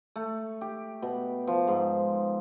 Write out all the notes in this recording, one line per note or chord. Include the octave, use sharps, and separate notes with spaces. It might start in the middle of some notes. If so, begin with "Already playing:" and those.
A3
G4
B2
F3
G#2